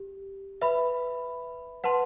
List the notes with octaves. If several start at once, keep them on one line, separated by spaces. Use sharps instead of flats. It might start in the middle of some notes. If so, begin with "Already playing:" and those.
Already playing: G4
B4 E5 B5
B4 F#5 A5 C6